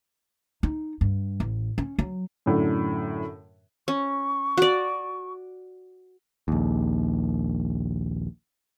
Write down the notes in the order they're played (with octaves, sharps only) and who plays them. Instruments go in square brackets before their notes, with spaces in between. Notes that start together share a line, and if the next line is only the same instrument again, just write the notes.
[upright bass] D#4
G2
A1
C#4
F#3
[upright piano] F#2 A2 D3
[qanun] C#4 [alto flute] C#6
[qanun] F#4 D5
[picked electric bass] A#1 D#2